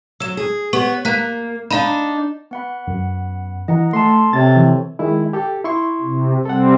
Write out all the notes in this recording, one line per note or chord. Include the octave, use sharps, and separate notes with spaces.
F#3 E6 E7
G#4
B3 G4 C#5 C#6
A#3 A#5 F#6 B6
D4 D#4 F5 A#5 B5
B3 F#5 B5
F#2
E3 D#5 F#5 A#5
A3 A4 A5 C6
C3 C4 A4 C#5 A6
E3
D#3 G#3 E4
G4 A4
E4 C6 C#6
C3
C3 G3 C4 A4 F#5